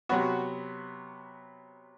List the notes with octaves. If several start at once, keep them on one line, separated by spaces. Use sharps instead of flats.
C3 F#3 B3 F#4